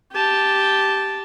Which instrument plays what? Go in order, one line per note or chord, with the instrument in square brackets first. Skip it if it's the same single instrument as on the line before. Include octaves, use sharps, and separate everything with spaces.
[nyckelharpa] G4 A5